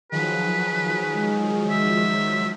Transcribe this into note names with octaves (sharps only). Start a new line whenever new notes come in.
D#3 F3 F#3 G#4 B4
G#3
E5